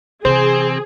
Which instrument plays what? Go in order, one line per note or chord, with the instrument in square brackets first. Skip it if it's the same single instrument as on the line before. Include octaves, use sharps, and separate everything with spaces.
[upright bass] C3 E3 [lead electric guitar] C4 [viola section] G#4 [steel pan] C5